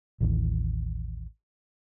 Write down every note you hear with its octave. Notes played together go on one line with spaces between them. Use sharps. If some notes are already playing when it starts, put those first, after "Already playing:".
A1 D#2 E3